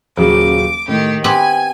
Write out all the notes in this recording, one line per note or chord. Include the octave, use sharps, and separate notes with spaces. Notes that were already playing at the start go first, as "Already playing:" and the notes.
D#1 C#3 F#3 D6
A2 D#3 G4
B3 C4 G4 G#5 F#7